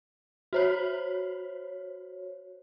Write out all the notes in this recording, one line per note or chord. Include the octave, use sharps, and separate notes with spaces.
F#4 C5 C#5